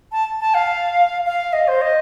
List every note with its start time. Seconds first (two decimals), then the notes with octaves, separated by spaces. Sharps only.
0.12 A5
0.40 A5
0.54 F5
1.26 F5
1.53 D#5
1.68 C5
1.81 D#5